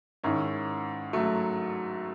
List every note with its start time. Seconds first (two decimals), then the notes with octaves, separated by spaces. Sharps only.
0.24 G#2 D#3 C#4 E4
1.13 F#3 A3